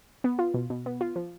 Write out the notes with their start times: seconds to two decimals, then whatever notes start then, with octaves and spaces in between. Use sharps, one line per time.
0.24 B3
0.39 F4
0.54 B2
0.70 B2
0.86 B3
1.01 F4
1.16 F3